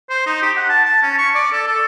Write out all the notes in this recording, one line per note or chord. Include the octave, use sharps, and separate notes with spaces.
C5
D#4
G4
F#5
A5
A5
C#4
C#6
D5
A4
A4